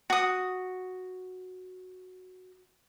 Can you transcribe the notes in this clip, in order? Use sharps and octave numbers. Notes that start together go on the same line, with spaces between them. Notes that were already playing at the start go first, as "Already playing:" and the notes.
F#4 D#6